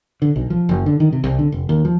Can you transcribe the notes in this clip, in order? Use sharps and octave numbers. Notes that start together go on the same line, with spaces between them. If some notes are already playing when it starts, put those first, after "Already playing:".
D3
B1
F3
F#1
D3
D#3
C3
C2
D3
F1
D#2
F3